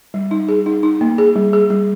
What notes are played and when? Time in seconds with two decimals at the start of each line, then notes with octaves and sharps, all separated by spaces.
0.14 G3
0.31 D#4
0.49 G#4
0.66 D#4
0.83 D#4
1.01 A#3
1.18 G#4
1.36 G3
1.53 G#4
1.70 G3